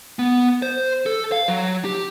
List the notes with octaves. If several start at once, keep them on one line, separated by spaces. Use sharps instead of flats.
B3
C5
A4
F5
F#3
G4